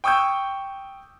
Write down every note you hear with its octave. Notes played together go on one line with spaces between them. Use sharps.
G5 C#6 D#6 E6 G6